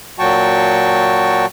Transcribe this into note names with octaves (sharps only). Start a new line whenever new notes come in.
A#2 F#3 F#4 G5 A5 C#6